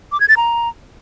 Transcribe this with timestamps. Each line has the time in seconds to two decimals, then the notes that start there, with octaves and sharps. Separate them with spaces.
0.12 D6
0.20 G#6
0.29 A6
0.37 A#5